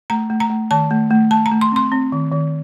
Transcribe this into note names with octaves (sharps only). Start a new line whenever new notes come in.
A3 A#5
A3
A#5
A3
D#3 A5
A3
A3
A3 A5
A#5
A3
C6
C4 C6
C4
D#3
D#3